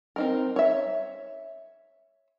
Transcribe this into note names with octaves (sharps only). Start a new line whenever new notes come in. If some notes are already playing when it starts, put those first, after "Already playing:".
C4 D#4 A#4
C#5 E5